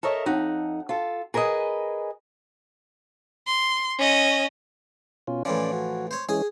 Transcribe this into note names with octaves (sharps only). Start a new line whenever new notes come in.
A4 A#4 C#5 D#5 E5
F2 D#4 F#5
F4 A4
G#4 A#4 B4 C#5 D#5 G#5
C6
C#4 D#5
B2 C#4 F4
A2 E3 F3 C#4 D5
F#4
C5 C#5
E3 G#3 C#4 G#4